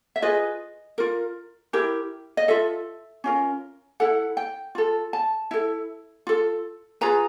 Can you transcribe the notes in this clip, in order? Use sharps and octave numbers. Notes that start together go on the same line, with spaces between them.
E5
F4 G#4 B4 D#5
F4 A#4
E4 G4 A#4
D#5
F4 A4 E5
C#4 F4 A#4
E4 A4 F#5
G5
F4 A4
A5
E4 A4
F4 A4
F4 G#4 B4 A#5